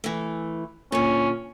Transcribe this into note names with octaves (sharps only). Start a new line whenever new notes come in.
E3 A3
A#2 D3 C#4